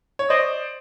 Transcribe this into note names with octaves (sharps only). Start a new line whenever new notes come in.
C#5
C5 D5 D#5